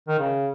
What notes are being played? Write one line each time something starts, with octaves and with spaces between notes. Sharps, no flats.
D#3
C#3